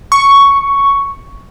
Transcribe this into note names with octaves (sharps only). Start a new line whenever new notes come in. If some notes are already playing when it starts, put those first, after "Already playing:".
C#6